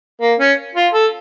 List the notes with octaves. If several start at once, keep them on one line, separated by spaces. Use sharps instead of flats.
A#3
C#4
F4
A4